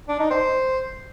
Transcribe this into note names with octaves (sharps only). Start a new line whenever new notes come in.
D4
D#4
C5